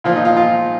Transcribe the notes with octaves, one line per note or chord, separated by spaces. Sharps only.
A#2 F3 F4
D#4
F4
F4